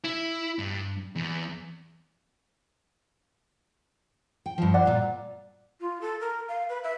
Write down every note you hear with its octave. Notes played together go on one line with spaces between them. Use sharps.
E4
G2
E2
G5
G2 F3
C5 D5 F#5
A#2 F4
F4
A4
A#4
F5
B4
E5